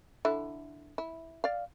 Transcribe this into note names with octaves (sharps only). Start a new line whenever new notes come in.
D3 E4
E4
D5 F5